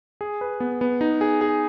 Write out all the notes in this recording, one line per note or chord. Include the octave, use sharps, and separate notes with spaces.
G#4
B4
B3
B3
D#4
G#4
G#4